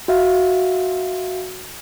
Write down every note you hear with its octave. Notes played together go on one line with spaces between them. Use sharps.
F#4 E5 F5